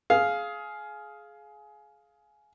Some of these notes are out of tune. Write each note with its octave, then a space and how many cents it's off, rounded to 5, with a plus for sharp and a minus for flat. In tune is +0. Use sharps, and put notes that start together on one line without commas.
G#4 +20 F5 +0